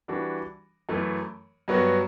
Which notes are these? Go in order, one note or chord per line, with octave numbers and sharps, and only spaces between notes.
E3 G3 D4 F#4
F#2 E3 A3
G2 F#3 B3 F#4